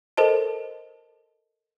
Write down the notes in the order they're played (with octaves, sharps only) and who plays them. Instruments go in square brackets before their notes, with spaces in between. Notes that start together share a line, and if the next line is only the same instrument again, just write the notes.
[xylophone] A4 A#4 C5 D#5 A5